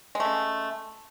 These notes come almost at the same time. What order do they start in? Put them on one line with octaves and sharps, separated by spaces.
G#3 A3 C#3